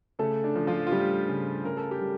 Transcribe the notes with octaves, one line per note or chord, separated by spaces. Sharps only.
C#3 A3 A4
D4
F3
F3 F4
F4
G3 A3 G4
C#3
C#3 A#4
A4
G4
G3